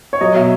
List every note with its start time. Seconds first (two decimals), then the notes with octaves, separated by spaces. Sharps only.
0.13 C#5
0.21 F#3 D#5
0.35 B2 E5